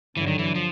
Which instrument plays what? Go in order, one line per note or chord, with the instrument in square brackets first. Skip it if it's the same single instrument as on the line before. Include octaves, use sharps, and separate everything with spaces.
[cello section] G2 D3 F#3 [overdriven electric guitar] E3
[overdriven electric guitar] D#3
E3
F3